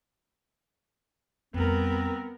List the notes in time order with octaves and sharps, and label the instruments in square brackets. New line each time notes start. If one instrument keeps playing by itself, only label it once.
[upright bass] F2 G3 [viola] B3 A#4 [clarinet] C4